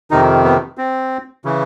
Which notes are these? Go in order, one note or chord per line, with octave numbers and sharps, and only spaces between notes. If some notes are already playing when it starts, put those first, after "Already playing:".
F2 C3 D#3 D#4
B3
C4
C#3 E3